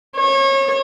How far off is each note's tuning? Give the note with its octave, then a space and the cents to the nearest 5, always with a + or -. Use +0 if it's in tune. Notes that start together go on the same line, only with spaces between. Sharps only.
C#5 -30